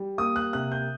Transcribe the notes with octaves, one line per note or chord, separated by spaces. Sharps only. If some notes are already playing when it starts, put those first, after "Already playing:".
Already playing: G3
A#3 D#6
F#6
C3 F#6
G6